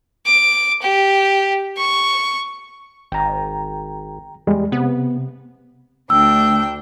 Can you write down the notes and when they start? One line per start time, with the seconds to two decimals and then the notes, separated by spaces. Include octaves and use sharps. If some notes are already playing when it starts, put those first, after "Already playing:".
0.26 D6
0.82 G4
1.77 C#6
3.12 G#1 G5 A#5
4.47 E2 G3 G#3
4.72 C3 B3
6.10 D2 D4 G5 E6